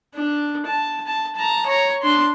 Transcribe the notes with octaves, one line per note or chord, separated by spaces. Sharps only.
D4
A5
A5
A5 A#5
C#5 A#5
D4 C6